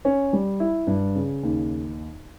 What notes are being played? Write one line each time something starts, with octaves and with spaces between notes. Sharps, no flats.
C#4
G3
E4
G2
C#3
D#2